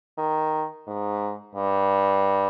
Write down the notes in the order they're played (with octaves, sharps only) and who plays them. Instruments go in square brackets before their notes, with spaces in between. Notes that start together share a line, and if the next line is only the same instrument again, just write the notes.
[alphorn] D#3
G#2
G2